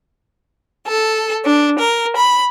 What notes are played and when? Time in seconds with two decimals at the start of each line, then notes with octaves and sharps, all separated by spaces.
0.87 A4
1.45 D4
1.79 A#4
2.16 B5